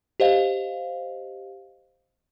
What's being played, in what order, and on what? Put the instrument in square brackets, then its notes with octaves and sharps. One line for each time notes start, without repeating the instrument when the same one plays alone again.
[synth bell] G4 C5 D#5 F5